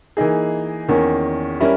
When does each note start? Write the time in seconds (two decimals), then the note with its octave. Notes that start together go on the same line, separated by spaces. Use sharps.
0.17 E3 A#3 D#4 G#4
0.88 E2 D#3 A#3 C#4
1.61 G3 C#4 E4 A#4